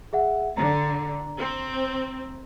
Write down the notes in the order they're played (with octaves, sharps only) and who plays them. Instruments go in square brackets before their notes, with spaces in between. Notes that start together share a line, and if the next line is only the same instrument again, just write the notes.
[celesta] G#4 E5 F#5
[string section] D3 [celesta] A#5
[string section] C4